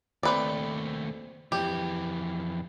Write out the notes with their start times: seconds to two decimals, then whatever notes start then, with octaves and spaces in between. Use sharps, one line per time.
0.23 D#2 A3 C4 B4 D5
1.52 F2 E3 G4